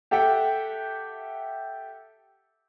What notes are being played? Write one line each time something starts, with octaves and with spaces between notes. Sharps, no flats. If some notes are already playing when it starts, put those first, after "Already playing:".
G4 A4 E5 F#5 G5